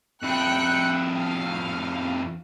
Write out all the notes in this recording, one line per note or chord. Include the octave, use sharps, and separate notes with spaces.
F2 E4 G5 F#6 C#7
F5